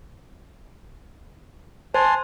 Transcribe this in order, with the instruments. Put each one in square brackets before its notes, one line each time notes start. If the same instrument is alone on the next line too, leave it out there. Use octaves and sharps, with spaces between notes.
[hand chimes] C5 [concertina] G#5 A5 C6